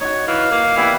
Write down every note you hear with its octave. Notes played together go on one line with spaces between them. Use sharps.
D#4 F#4 C#5
E3 F5
A#3
E3 G3 B3 E4